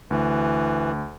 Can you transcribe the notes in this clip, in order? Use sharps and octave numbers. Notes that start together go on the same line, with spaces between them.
D2 E3